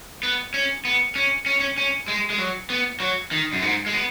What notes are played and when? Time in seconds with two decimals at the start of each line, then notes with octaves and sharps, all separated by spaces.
0.23 B3
0.54 C#4
0.85 B3
1.16 C#4
1.46 C#4
1.60 C#4
1.78 C#4
2.08 G#3
2.30 G#3
2.38 F#3
2.70 B3
3.00 F#3
3.31 D#3
3.53 F#2
3.62 G#2
3.86 G#3
3.93 B3